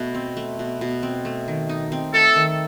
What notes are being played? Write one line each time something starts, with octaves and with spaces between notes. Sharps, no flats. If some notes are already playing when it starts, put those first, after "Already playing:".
Already playing: B2 A3
C4
A3
B2
B2
C4
A3
D#3
D#4
C4
A3 A4
D#3